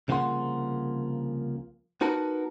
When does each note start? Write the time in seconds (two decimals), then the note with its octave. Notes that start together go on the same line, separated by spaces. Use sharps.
0.08 C2 C#3 F3 A#3 F#5 C6
2.01 B3 D#4 F#4 A#4 B4 A5